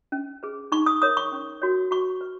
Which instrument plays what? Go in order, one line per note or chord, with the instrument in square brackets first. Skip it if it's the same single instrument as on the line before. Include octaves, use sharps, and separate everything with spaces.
[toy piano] C#4
G#4 B4
D#4 C#6
D#6
A#4 C#5 D#6
C#6
C#4
F#4 A#4 C#5
F#4 C#6
B4